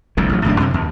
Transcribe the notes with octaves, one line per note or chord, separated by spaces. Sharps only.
F1 C2 F2 D3
A1 F#3
D#1 A2 F#3 D4
F#2 C3
D#2